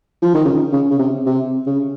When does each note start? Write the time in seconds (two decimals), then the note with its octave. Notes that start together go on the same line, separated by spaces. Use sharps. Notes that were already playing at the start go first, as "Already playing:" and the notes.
0.22 F3
0.34 D#3
0.45 C#3
0.72 C#3
0.90 C#3
0.99 C3
1.26 C3
1.66 C#3